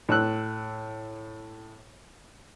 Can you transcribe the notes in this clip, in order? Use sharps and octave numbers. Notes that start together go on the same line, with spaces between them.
A2 E6 F#6